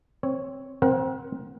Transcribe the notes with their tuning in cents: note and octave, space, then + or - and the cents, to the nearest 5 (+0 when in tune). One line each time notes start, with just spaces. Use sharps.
C4 +10 C#5 +0
C4 +0 A#4 +35 F#5 +0